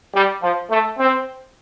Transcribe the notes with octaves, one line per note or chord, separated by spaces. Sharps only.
G3
F3
A3
C4